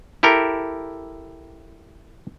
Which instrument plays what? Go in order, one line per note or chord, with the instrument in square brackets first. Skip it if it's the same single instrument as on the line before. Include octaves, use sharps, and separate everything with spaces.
[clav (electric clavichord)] E4 G4 A4 A#4